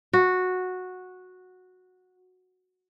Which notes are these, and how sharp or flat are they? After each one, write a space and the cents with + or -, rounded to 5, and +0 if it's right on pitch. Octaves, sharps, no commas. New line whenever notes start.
F#4 -10